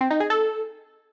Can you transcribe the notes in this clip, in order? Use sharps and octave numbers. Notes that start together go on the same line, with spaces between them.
C4
D#4
G#4
A4